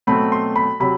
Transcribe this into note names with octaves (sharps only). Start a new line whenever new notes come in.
B2 F#3 A3 C4 B5
C6
B5
C3 F#3 B5